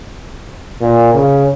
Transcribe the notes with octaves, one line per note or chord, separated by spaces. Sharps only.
A#2
C#3